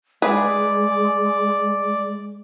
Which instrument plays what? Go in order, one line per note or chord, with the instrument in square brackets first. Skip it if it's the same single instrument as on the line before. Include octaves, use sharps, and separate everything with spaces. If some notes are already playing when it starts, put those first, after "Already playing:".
[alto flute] G#3 [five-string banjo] G#4 B4 [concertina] D5